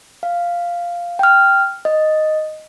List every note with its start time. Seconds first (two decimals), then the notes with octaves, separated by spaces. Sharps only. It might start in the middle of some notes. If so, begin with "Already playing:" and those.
0.23 F5
1.19 G5 F6
1.85 D#5